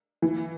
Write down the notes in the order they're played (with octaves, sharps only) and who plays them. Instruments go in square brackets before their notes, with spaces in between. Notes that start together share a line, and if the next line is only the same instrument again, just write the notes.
[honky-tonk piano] E3